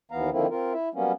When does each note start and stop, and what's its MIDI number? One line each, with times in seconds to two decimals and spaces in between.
0.11 0.30 39
0.11 0.30 52
0.11 0.30 59
0.11 0.30 77
0.11 0.30 82
0.31 0.47 50
0.31 0.47 51
0.31 0.47 53
0.31 0.47 58
0.31 0.47 60
0.31 0.47 64
0.50 0.73 60
0.50 0.73 65
0.50 0.73 70
0.73 0.89 64
0.73 0.89 76
0.94 1.12 54
0.94 1.12 55
0.94 1.12 58
0.94 1.12 59
0.94 1.12 61